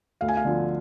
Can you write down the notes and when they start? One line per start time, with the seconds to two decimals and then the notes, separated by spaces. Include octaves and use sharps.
0.21 D2 F5
0.28 G#5
0.37 F5
0.45 D3 F3